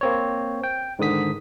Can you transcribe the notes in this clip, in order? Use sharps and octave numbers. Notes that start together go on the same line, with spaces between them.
A#3 C4 C#5
G5
G#2 D3 D#3 D#6 B6